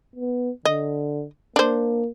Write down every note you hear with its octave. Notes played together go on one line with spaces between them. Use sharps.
B3
D3 D#5
A#3 D4 C5